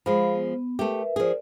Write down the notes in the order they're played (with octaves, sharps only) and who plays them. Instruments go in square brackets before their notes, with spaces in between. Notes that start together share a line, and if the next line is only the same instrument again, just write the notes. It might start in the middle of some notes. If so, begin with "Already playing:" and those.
[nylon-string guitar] F3 G#3 [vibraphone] F5 B5
[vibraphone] B3
[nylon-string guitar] A3 G4 [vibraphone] A#4 B4 E5
[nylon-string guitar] F3 G#4 [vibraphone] A#4 D5